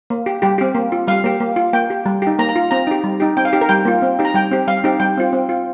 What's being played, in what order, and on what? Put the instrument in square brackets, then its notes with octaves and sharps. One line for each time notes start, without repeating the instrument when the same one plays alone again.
[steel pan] A#3
G4
G3 G4
C4 G4
A#3
F4
G3 F5
A#3 G4
A#3
F4
A#3 G5
G4
G3
D#4 G4
A#3 A#5
A#5
F4
C4 A#5
D#4 G4
G3
D#4 G4
C4 G5
F5
D#4 G4
A#4
G3 G5
A#3 F4
C4
D#4 G4
A#5
G3 G5
C4 G4
G3 F5
C4 D#4 G4
G3 G5
C4 F4
C4
F4